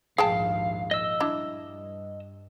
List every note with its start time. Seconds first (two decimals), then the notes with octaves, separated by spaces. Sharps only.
0.18 A#1 D#2 G#2 G#4 F5 G5 A5
0.91 D#5 E6
1.20 G2 D4 E4